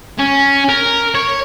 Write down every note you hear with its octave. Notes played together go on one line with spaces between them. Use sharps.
C#4
A#4
C#5